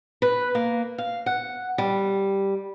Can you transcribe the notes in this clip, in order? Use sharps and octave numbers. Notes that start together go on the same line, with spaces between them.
B4
A#3
F5
F#5
G3